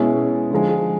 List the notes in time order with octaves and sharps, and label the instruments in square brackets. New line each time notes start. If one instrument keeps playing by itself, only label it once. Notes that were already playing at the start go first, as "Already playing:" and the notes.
Already playing: [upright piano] B2 G#3 C#4 E4
D3 F3 G#3